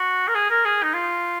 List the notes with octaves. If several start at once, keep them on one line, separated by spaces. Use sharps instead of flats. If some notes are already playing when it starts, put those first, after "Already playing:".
Already playing: F#4
A#4
G#4
A#4
G#4
D#4
F4